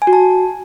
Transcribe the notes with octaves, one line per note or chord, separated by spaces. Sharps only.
G#5
F#4
A5